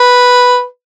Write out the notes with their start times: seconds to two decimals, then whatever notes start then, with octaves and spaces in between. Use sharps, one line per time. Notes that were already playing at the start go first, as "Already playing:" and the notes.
Already playing: B4